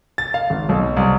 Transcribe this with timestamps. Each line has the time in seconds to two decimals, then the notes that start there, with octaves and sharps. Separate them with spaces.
0.18 A6
0.34 F5
0.50 G#1
0.69 B1
0.97 C2